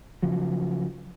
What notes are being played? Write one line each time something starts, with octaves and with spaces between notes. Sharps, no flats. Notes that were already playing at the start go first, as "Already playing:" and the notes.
C#3 F3 F#3